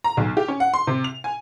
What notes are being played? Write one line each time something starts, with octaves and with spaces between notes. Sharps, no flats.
A#5
B1
G4
C#4
F#5
C6
C3
F7
G#5